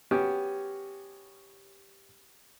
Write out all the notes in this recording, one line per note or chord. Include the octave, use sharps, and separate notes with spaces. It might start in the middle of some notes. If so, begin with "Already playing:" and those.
B3 C#4 F#4 G4